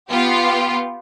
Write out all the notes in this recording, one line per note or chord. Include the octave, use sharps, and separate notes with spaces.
B3 F4 G4